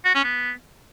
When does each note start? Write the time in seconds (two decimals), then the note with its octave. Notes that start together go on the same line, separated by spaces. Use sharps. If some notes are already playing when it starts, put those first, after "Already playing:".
0.05 F#4
0.15 C#4
0.24 B3